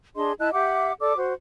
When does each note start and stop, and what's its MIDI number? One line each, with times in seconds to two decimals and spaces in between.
0.16 0.33 62
0.16 0.33 68
0.16 0.33 75
0.16 0.33 84
0.40 0.52 64
0.40 0.52 75
0.40 0.52 81
0.40 0.52 90
0.53 0.93 67
0.53 0.93 76
0.53 0.93 78
0.53 0.93 86
1.00 1.16 69
1.00 1.16 74
1.00 1.16 86
1.17 1.33 66
1.17 1.33 72